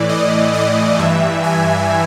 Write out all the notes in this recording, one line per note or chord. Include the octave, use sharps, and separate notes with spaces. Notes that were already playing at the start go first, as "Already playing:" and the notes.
Already playing: A2 E3 D5
D#5
D#5
G2 E3 E5
G#5